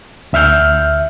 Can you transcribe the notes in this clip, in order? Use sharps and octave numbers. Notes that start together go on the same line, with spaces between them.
D2 E5 F6 G6